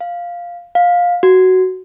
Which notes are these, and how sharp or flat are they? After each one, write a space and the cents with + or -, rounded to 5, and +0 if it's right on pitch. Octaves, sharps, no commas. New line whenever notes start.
F5 +0
F5 +15
F#4 +10